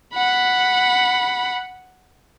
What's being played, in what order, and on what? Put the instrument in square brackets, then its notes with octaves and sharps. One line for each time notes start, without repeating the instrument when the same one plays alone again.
[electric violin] F#5 B5